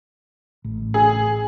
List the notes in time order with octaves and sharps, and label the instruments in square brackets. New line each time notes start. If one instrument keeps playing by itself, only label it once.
[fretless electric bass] A1
[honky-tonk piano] G#4